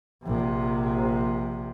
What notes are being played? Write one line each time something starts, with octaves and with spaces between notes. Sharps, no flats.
A#1 C3